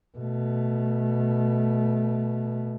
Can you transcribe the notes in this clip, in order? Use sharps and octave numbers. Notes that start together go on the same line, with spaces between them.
B2 A3